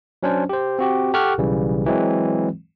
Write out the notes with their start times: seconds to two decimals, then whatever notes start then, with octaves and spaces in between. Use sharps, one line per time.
0.23 F#3 C#4 D4 C5
0.49 G4 C5
0.79 C4 F#4 G4
1.14 G4 A4 F#5 C#6 F6 F#6
1.38 B1 C#3 E3 G3
1.86 E3 F#3 G#3 C4